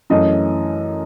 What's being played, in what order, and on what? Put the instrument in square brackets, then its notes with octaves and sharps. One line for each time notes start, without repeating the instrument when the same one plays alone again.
[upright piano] F#2 E3 A3 C#4 D#5